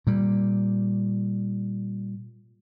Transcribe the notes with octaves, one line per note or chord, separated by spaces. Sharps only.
A#2 G3